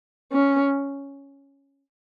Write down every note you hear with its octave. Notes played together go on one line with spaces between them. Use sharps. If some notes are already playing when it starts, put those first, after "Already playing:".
C#4